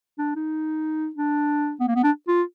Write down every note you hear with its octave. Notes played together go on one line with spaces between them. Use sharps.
D4
D#4
D4
B3
A#3
B3
D4
F4